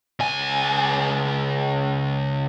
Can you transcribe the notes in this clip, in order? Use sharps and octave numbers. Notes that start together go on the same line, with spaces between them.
C#2 G#5